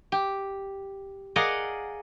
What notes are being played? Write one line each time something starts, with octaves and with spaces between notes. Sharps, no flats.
G4
G#4 A#4 D5 D#5 F5 F#5